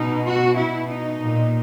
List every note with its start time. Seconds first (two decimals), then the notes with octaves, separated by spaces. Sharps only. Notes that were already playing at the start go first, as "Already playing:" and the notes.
Already playing: B2 D#4
0.25 F#4
0.57 B2 E4
0.89 D#4
1.22 A#2